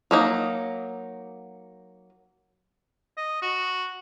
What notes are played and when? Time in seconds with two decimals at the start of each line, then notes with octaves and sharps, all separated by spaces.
0.11 F#3 A#3 D#4
3.18 D#5
3.42 F#4